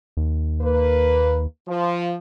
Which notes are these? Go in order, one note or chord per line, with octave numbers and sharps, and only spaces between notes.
D#2
A#3 B4
F3